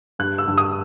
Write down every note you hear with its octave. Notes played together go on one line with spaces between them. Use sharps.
G2 F#6
E6
G2
D#6